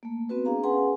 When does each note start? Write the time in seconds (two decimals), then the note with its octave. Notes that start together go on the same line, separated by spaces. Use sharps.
0.03 A3 A#3
0.29 B3 C4 F#4 B4
0.45 D4 G#4 F5 A#5
0.63 C#4 G#4 B4 F#5 G#5 C6